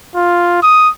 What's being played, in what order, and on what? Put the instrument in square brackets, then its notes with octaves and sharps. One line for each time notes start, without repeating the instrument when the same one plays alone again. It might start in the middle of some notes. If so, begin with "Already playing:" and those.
[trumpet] F4
D#6